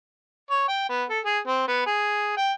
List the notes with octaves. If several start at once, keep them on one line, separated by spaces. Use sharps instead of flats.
C#5
G5
B3
A4
G#4
C4
B3
G#4
G5